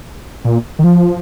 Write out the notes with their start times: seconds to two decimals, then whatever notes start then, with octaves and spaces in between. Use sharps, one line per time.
0.45 A#2
0.79 D#3
0.84 F3